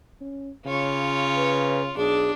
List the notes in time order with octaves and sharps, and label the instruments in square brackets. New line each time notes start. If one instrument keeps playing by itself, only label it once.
[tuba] C#4
[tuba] C#3 [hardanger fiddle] F4 C#5
[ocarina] B4
[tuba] B1 [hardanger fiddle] D4 [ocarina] G#4